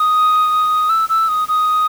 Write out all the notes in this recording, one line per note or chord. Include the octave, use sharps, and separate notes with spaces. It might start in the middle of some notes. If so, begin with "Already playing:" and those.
Already playing: D#6
E6
E6
D#6
D#6